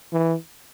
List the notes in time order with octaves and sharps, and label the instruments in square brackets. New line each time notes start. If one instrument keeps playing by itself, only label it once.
[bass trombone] E3